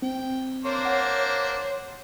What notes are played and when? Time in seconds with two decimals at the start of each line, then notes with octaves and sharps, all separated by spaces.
0.02 C4 G5
0.65 A#3 D4 C5 C#5
0.85 F#5